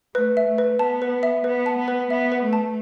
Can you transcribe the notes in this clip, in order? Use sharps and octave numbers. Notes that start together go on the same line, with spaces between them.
A3 B4
E5
A3
B4
B3 A5
B4
E5
B3 B4
A5
B3
B4
B3 E5
B4
A3
A5